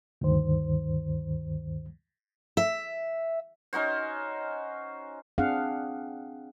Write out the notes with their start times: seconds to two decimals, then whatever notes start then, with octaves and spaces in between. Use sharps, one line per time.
0.21 D2 G2 D#3 C5
2.57 E5
3.73 C#4 D#4 F#4 C5
5.38 C4 D4 G#4 F5 F#5